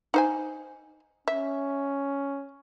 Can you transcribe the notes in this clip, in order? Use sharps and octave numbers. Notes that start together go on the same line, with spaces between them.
D#4 C5 G#5
C#4 E5